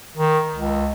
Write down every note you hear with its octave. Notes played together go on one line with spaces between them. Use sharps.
D#3
C#2